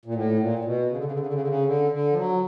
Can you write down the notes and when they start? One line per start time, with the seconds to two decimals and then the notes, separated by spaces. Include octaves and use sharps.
0.05 A#2
0.14 A2
0.39 A#2
0.59 A#2
0.64 B2
0.90 C#3
0.97 D3
1.05 C#3
1.12 D3
1.19 C#3
1.26 D3
1.34 C#3
1.41 D3
1.47 C#3
1.66 D3
1.91 D3
2.12 F3
2.17 F#3